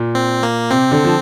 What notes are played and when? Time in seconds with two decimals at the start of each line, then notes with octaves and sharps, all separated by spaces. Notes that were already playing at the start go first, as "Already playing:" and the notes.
Already playing: A#2
0.15 C4
0.43 A#3
0.71 C3 C4
0.91 D3
1.05 F3